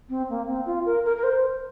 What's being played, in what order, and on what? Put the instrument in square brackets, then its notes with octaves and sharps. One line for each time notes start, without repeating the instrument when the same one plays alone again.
[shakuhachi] C4
A#3
C4
F4
A#4
A#4
A#4
C5